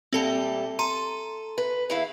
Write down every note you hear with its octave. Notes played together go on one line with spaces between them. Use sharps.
A#2 G3 A3 C4 A4 A5
A4 A#5 C6 D#7
B4
E2 E4 F5